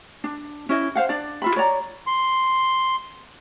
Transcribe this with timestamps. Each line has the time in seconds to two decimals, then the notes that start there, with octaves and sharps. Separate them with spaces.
0.24 D4
0.69 C#4 E4 D#5
0.95 C5 F5 F#5
1.09 D4 D5
1.42 F4 E5 B5
1.56 C#5 D5 A#5
2.07 C6